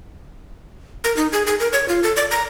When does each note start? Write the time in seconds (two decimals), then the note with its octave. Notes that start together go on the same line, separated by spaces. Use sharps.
1.04 A#4
1.17 D#4
1.33 G#4
1.47 G#4
1.60 A#4
1.73 C#5
1.88 F4
2.03 A4
2.16 D5
2.31 A#5